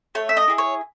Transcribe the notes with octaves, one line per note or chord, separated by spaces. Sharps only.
A3 C#5
E5
D#5
E4 G#4
C#5